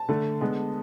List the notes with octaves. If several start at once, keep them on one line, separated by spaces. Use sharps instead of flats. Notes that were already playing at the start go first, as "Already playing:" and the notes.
Already playing: A5
D3 A3
D3 G#3 B3